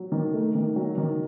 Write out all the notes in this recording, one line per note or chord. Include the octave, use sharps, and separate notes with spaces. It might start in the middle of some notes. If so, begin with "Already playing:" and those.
Already playing: F#3
D#3
A3
D#3
F#3
D#3